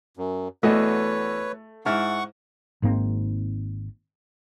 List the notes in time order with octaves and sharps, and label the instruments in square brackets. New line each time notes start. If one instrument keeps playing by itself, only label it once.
[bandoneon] F#2
[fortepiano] E2 F#4 D#5 [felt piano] A3 [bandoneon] B4 C#5
[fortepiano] G#2 E4 F6 [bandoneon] F#5 C#6
[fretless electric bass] G#1 G#2 A#3 C4